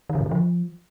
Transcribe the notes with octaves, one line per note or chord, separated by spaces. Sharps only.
D#3
D3
G#2
D3
F3